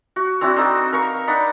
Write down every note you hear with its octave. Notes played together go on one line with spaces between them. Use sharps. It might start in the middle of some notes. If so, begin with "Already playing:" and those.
F#4
C4 D4 E4 F#4
C4 D#4 A4 F#5
A#4 F5 C#6
D4 D#4 F#5 B5